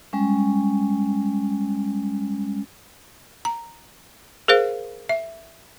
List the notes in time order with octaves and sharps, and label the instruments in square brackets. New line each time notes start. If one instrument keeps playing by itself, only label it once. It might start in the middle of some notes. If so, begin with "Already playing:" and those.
[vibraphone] G3 G#3 C#4
[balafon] A#5
G#4 A#4 C5 F5
E5